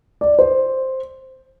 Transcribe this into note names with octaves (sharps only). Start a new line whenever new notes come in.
D5
C5